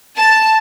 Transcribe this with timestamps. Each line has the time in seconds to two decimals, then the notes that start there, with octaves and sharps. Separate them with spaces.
0.17 A5